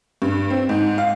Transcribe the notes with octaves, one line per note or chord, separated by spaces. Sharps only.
G2
C4
G#2
F5